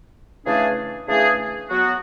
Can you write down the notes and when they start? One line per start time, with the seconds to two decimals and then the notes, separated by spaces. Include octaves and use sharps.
0.46 C#3 E3 A3 D4 G#4
1.08 C#3 E3 A3 D4 G#4
1.70 F#3 B3 F#4